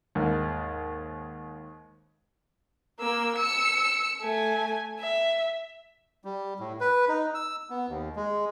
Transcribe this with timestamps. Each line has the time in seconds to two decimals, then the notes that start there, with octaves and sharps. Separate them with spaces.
0.15 D#2 G#2 A#3
3.00 A#3 E6
3.36 E6 C#7
4.21 A3 G#5
5.00 E5
6.24 G3
6.60 A2
6.80 B4
7.08 D#4
7.34 E6
7.70 B3
7.89 D#2
8.16 G#3